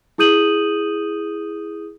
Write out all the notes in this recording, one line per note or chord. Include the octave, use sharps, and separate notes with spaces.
E4 G#4 D#6 G6 D#7 F#7